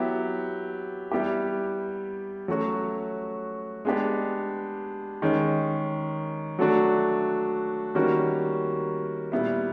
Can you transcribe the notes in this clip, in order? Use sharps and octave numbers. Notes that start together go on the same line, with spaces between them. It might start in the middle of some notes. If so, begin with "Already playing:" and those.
Already playing: F#3 B3 E4 G4
G3 B3 E4 G4
F#3 A3 C#4 F#4
G#3 B3 D4 G4
D#3 G#3 C#4
F#3 A3 D4 F#4
D#3 G3 A#3 C#4 F#4
A#2 G3 B3 E4